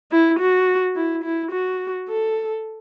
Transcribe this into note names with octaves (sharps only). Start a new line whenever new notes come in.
E4
F#4
E4
E4
F#4
A4